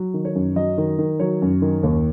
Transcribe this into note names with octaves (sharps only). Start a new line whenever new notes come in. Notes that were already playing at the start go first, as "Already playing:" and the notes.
Already playing: F#3
D#3
C#5
F#2
F#3 D#5
D#3
D#3
F#3 C#5
F#2
D#3
D#2